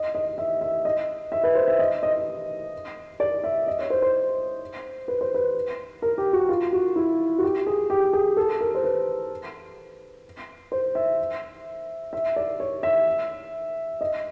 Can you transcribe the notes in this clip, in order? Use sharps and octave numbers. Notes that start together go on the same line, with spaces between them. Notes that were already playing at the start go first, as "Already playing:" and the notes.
Already playing: D#5
D#5
E5
E5
D#5
E5
B4
C5
E5
D#5
D#5
D5
E5
D#5
C#5
C5
C5
B4
C5
B4
A#4
G4
F#4
F4
F#4
E4
F#4
G4
G#4
G4
G#4
A4
A#4
C5
B4
C5
E5
E5
D5
C#5
E5
D#5